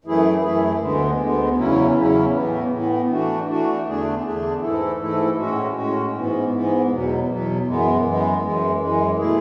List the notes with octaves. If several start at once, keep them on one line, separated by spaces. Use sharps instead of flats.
F#2 E3 A3 E4 G#4
F#2 E3 A3 E4 G#4
D2 D3 G#3 B3
D2 D3 G#3 B3
E2 C#3 F#3 C#4 E4
E2 C#3 F#3 C#4 E4
A2 E3 B3
A2 E3 B3
E3 A3 D4 F#4
E3 A3 D4 F#4
E2 D3 A3 D4 G#4
E2 D3 A3 D4 G#4
G#2 E3 A3 E4 A4
G#2 E3 A3 E4 A4
A2 G#3 C#4 F#4
A2 G#3 C#4 F#4
G#2 E3 B3
G#2 E3 B3
E2 B2 F#3
E2 B2 F#3
F#2 E3 G#3 B3
F#2 E3 G#3 B3
F#2 E3 G#3
F#2 E3 G#3
B2 A3 E4 G#4